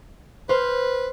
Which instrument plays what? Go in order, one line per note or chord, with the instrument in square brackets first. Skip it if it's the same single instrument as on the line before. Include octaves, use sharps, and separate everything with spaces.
[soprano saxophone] B4 [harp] C5 F6